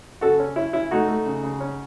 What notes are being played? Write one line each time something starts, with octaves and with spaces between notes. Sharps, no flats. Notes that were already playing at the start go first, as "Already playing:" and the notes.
C#3 F#4 A4
C#4
C#4 E4
C#4 E4
A3 D#4 F#4
A3
C#3
C#3
C#4